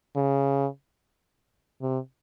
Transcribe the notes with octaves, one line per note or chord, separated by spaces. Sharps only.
C#3
C3